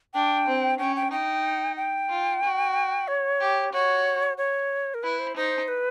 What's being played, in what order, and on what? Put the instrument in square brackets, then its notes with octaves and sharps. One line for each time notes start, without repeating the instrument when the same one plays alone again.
[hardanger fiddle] D4 [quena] G5
[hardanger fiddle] C4
[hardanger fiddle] C#4 [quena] G5
[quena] G5
[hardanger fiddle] D#4 [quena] G5
[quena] G5
[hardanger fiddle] F4
F#4
[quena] C#5
[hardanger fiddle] G4
[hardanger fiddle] F#4 [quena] C#5
[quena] C#5
A#4
[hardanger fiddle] E4 [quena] B4
[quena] C5
[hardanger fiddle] D#4 [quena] C5
[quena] B4